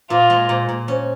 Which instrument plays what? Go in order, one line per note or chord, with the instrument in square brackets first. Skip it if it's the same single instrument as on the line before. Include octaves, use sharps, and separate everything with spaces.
[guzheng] A#2 [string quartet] F4
[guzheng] G#3
A#2
A#2
C#4